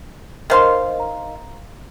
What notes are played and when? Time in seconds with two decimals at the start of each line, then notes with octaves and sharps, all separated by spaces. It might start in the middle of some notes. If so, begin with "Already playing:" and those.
0.50 D#3 A#4 C5 D#5 F5 C6
1.00 A#5